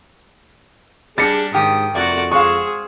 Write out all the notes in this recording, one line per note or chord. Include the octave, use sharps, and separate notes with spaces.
G3 D4 G#4 A6 A#6 C#7
G#2 D#3 G4 D#6
F2 C3 A3 A#3 F#4 D5
G#3 C4 G#4 F5 C#6